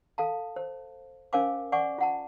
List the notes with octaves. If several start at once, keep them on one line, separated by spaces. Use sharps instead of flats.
A4 F5 A5
C5
C#4 A#4 C5 F5 G#5 D6
D5 F#5 G#5 C#6 D6
F4 F#5 A5